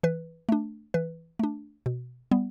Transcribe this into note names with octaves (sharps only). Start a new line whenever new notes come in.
E3 B4
A3 D4
E3 B4
A3 D4
B2
G3 B3